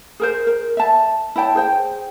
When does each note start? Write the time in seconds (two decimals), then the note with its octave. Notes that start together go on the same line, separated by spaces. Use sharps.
0.20 G#4 A#4 C5
0.47 A#4
0.77 E5 A5
1.36 E4 C#5 G5 A5
1.55 G#4 C5 G5